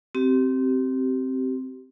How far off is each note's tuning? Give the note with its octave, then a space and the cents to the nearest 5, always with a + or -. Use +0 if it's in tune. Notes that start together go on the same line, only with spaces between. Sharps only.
C4 +0 G4 -30